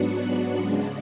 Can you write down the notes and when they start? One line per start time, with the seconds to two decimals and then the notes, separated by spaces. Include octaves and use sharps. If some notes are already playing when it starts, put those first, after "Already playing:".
Already playing: G#2 F#3 B3 D4 F#4 F#5
0.55 C#3 G#3 D4